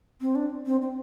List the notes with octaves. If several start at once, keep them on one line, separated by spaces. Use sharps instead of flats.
C4
D4
C4
C4